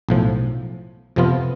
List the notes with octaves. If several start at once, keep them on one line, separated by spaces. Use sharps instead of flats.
B1 A2 F3
F2 C3 F3 B3 F4